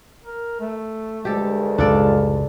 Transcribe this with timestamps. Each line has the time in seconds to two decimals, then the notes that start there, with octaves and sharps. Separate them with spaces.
0.25 A#4
0.61 A3
1.25 D2 G2 G#3 G4 A4
1.78 C#2 F#2 A2 D4 F4 A4 D5